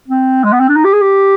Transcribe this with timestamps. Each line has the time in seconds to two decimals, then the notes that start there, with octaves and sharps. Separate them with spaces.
0.08 C4
0.44 G#3
0.53 B3
0.60 C4
0.68 D4
0.76 D#4
0.84 G4
0.93 G#4
1.01 G4